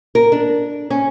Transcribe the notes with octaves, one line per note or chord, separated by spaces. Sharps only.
A#4
D4
C#4